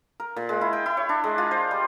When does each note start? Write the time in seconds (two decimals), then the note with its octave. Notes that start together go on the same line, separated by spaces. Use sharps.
0.20 A#4
0.36 A#2
0.49 G#3
0.61 E4
0.73 G5
0.86 E4
0.97 C#5
1.09 D4
1.24 G#3
1.38 F4
1.51 C5
1.71 G3